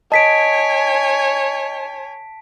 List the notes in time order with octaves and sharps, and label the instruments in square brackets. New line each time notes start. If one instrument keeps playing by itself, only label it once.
[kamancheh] C#5 G#5 [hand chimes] D#5 [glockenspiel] A5 B6 D7